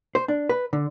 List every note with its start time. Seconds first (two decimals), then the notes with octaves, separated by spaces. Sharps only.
0.15 C5
0.28 D4
0.49 B4
0.73 D3